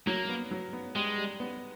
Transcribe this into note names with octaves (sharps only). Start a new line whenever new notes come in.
F#3 A#3
B3
F#3
B3
G3 G#3
G3
B3